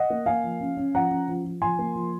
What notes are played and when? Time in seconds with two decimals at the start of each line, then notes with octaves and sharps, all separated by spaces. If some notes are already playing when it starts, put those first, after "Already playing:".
Already playing: D#5 F#5
0.10 A#3
0.26 A#3 F5 G#5
0.44 F3
0.60 C#4
0.77 C#4
0.94 F3 F#5 A#5
1.11 C#4
1.28 F3
1.44 F3
1.62 F3 G#5 C6
1.79 A#3
1.95 F3